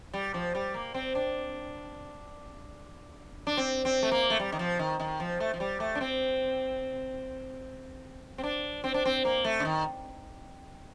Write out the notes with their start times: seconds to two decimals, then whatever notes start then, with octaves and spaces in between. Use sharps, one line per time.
0.13 G3
0.34 F3
0.55 G3
0.74 A#3
0.94 C4
1.15 D4
3.47 D4
3.57 C4
3.85 C4
4.03 A3
4.11 A#3
4.30 A3
4.40 G3
4.52 D#3
4.59 F3
4.79 D#3
5.00 D#3
5.20 F3
5.40 A3
5.54 F3
5.60 G3
5.80 A3
5.95 D4
6.01 C4
8.38 C4
8.43 D4
8.84 C4
8.94 D4
9.05 C4
9.25 A#3
9.44 A3
9.60 D3
9.65 D#3